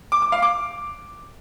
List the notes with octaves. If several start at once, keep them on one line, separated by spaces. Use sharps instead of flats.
D6
D6
F5
D6